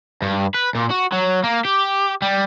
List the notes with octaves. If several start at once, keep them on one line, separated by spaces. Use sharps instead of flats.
G2
B4
A#2
F#4
F#3
A#3
G4
G3